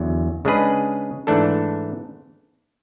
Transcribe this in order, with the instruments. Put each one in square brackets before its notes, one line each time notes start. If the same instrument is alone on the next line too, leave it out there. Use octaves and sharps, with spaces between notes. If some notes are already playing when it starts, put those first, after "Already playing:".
Already playing: [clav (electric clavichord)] E2 D3 F#3
C#3 G#3 D4 G#4 B4
G#2 E3 A3 D4 A4